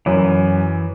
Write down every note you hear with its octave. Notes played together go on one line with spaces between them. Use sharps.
F#2 E3